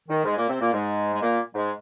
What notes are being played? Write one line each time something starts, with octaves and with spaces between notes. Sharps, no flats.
D#3
G#2 G#3
A#2 A#3
C3 C4
A#2 A#3
G#2 G#3
G#3
A#2 A#3
G#2 G#3